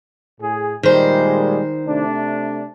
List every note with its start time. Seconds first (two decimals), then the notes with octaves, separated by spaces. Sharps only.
0.41 A2 G#4
0.83 A#2 D#3 G3 G#3 C5
1.86 C3 A3 D4